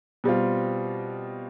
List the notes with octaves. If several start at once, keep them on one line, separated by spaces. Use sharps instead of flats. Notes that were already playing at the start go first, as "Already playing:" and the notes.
B2 G3 C4 F4